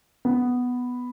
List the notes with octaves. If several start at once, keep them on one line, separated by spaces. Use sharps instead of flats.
B3